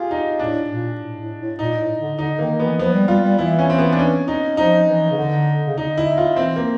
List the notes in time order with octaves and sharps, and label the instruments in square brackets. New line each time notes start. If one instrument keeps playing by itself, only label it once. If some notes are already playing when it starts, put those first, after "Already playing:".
Already playing: [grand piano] F4 G4 G#4
D#4
[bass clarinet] A2 [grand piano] D4
[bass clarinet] A#2
A2
A2
A2
[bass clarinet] A#2 [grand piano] D#4
[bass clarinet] A2
D3
[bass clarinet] D3 [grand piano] D#4
[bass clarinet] D#3 [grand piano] A#3
[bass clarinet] E3 [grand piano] B3
[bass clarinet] F3 [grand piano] B3
[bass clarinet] G3
[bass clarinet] G3 [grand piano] F4
[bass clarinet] G3
[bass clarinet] E3 [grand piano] E4
[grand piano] C#4
C4
B3
D4
C#4
D#4
[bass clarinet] F3 [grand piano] D#4
[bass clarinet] E3
C#3
D3
C#3
[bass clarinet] D3 [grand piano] D#4
[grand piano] E4
F4
[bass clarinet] E3 [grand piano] C4
[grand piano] A#3